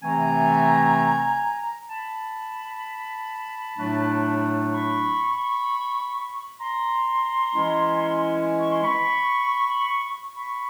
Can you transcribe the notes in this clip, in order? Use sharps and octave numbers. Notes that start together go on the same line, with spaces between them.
C3 E3 A3 C4 G#5 A#5
A5 B5
A2 F#3 A3 D4
B5 C#6
A#5 C6
E3 G#3 C#4 E4
C#6
C6
B5 C#6
B5 C#6